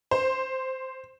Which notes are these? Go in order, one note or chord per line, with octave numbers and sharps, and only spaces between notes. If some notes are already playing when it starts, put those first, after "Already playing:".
C5